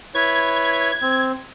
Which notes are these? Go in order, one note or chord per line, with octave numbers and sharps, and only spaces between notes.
E4 B4 C#5 G#6
C4